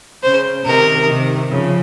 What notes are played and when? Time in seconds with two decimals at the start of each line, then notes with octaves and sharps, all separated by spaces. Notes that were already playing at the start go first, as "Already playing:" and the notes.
0.23 C#3 C5
0.65 C3 D#3 A#4
1.08 C3 D#3
1.51 C#3 F3